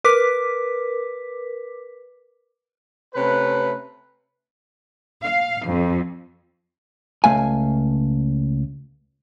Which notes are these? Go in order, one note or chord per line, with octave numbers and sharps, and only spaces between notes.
A#4 B4 D6 B6
C3 A3 C#4 B4
F5
F2
C#2 A3 F5 G#5